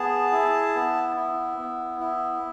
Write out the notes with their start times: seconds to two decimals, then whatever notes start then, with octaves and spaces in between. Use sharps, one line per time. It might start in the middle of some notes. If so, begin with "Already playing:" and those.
Already playing: B3 G#4 A5
0.32 E4
0.75 B3
1.17 E4
1.58 B3
2.00 E4